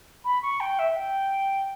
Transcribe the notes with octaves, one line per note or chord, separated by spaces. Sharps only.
B5
C#6
G5
E5
G5